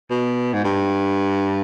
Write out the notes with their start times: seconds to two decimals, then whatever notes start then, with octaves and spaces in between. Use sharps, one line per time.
0.11 B2
0.54 G#2
0.64 G2